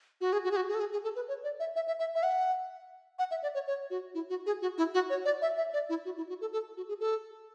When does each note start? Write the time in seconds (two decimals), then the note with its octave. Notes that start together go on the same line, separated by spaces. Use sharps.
0.21 F#4
0.33 G#4
0.44 F#4
0.51 G#4
0.56 F#4
0.69 G#4
0.74 A4
0.80 G#4
0.92 G#4
1.04 A4
1.16 B4
1.28 C#5
1.44 D5
1.60 E5
1.76 E5
1.87 E5
2.00 E5
2.15 E5
2.23 F#5
3.19 F#5
3.31 E5
3.43 D5
3.55 C#5
3.67 C#5
3.90 F#4
4.14 E4
4.30 F#4
4.46 G#4
4.62 F#4
4.78 E4
4.94 F#4
5.10 C#5
5.25 D5
5.42 E5
5.57 E5
5.73 D5
5.89 E4
6.05 F#4
6.17 E4
6.29 F#4
6.41 A4
6.53 A4
6.77 F#4
6.88 G#4
7.00 A4